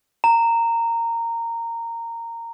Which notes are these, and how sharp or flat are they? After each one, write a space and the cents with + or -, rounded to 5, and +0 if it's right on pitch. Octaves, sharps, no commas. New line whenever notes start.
A#5 -15